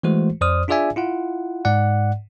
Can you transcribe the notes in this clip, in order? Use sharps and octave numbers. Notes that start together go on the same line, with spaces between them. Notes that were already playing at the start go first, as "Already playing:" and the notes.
E3 G#3 A3 F#4 C5
F2 C5 D5 D#6 F6
D4 F4 G#4 D5 E5 G#5
E4 F4 F#5
G#2 D5 F#5